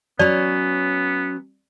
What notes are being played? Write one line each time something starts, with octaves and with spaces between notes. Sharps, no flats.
F#3 B3 C#4 D5